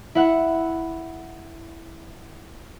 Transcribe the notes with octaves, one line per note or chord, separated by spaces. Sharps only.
E4 F#5